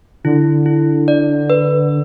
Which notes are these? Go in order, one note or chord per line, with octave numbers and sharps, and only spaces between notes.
D3 E4
E4
D5
B4